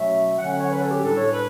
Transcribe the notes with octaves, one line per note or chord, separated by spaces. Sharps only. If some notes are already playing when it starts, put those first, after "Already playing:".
Already playing: B2 F#3 A3 C#4 E5
D3 F#3 C#4 F#5
F#5
C#5
B4
A4
G4
A2 G3 D4 A4
C#5
B4